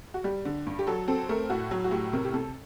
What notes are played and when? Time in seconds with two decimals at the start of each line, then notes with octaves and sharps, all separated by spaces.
0.14 F#4
0.24 G3 G4
0.45 D3
0.67 G2
0.79 G4
0.87 F#3 A4
1.08 C4 A4
1.29 A3 A#4
1.50 A2 F#4
1.71 F#3
1.84 F#4
1.91 A2 G4
2.13 C3 A#4
2.25 G4
2.34 C3 A4